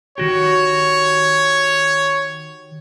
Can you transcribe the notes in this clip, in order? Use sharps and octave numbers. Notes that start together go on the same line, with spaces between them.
D#3 F#4 G4 C#5